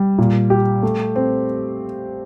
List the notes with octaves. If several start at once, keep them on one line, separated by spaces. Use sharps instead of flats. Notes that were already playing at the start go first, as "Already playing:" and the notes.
Already playing: G3
A#2
G4
A3
C4